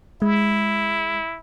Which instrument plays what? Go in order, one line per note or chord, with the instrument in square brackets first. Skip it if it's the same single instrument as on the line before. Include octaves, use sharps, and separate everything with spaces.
[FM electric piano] G#3 [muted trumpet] E4